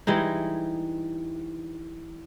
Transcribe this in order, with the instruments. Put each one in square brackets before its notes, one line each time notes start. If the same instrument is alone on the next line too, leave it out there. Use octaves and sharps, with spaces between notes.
[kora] E3 G3 G#3 D#4